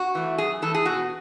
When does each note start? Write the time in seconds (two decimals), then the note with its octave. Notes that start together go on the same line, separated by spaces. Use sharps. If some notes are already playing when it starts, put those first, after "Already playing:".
Already playing: F#4
0.15 E3 A3
0.38 F#2 G#4
0.62 E3 A3 A4
0.74 G#4
0.85 B2 F#4